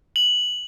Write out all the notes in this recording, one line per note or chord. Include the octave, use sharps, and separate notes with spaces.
F#7